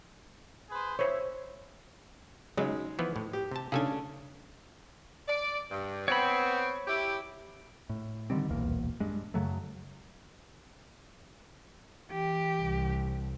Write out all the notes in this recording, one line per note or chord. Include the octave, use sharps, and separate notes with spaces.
G#4 B4 C5
E4 C5 C#5
C#3 F#3 G#3 D#4
E3 F3 B3
A2
G4
C3 A5
C#3 C#4 D4 G#4 A4 G#5
D5
G2
B3 C4 C#5 B5
E4 G4
A2
D3 D#3 G3 C4
D#1 B1 E2 A#3
G2 G#3
F#2 C#3 F#3 A3
E3 G4
C2